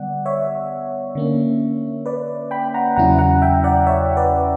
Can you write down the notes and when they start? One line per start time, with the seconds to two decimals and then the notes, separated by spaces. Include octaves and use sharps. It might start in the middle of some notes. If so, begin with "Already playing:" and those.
Already playing: D3 G3 B3 D5 F#5
0.26 C#5 E5
1.15 D3 A#3 C#4
2.06 B4 D5
2.51 G5 B5
2.74 F#5 A#5
2.96 E2 C#3 F#3 C#4 E4 F#5 A#5
3.18 F#5 A#5
3.42 E5 G5
3.64 D5 F#5
3.87 C#5 E5
4.17 B4 D5